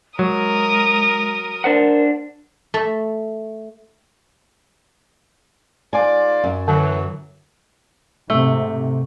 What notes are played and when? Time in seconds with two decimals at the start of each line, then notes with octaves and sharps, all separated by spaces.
0.19 F#3 G#3 A#4 D#6
1.64 D4 A#4 C5 F#5
2.74 A3 E5
5.93 G#2 F4 D5 G#5
6.44 F#2
6.68 D3 E3 F#3
8.30 G#2 C3 A3